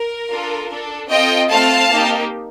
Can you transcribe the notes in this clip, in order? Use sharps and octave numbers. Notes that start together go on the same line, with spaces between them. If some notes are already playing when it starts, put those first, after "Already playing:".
Already playing: A#4
D4 F4 A4
D4 A4
C4 F4 A4 D#5 G5
A3 C4 F4 A4 F5 A5
A#3 D#4 G4